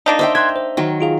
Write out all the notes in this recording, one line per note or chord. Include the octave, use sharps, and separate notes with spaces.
A#3 D4 D#4
C5 D#5 E5 G5
E5 C6 F#6 G#6
C5
D#3 F#3
F4 G#4 F5